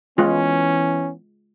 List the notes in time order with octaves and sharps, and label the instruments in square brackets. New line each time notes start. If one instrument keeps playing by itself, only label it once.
[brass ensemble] E3 B3 [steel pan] G#3 F4 [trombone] C#4